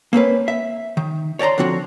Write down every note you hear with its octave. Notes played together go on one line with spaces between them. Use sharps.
A#3 C4 C#4 B4
E5
D#3
C#5 D5 G5 A#5 C6
D3 F3 C4 F#4